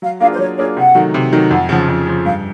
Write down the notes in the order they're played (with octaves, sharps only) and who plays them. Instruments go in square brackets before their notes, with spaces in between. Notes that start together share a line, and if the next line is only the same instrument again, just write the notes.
[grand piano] F#3 [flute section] F5
[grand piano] A#3 D4 F4 G#4 [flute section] F5
[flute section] C5
[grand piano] F#3 [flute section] C#5
[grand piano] A#3 D4 F4 G#4 [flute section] C#5
[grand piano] C3 [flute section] F#5
[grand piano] D#3 F#3 A3
C3
D#3 F#3 A3
[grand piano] F2 [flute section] F#5
[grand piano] C#3 F3
F2
C#3 F3
[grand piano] G2 [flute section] F5